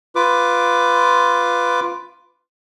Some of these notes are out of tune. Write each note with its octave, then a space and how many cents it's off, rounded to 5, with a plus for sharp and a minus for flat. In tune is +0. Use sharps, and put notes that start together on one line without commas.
F4 +0 B4 +10 D6 +0